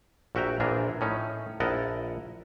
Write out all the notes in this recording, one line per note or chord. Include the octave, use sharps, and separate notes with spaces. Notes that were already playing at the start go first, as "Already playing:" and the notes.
A#1 F#4 E5 G5 A#5
A#1 A#2 E3 D4 G#4 A#4
A2 C#4 D#4
A#1 E4 A#4 D#5 F#5 A5